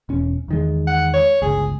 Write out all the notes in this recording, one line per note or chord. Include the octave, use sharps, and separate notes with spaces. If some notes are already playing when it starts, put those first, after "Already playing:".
E1 C#4
E2 D#3 G#3
F#5
C#5
G1 C#2 G#4